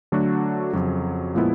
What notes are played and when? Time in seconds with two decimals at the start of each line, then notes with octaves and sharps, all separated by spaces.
0.12 D3 F#3 A3 D4 F#4
0.73 F2 C#3 F#3
1.35 A#2 F3 G#3 B3 E4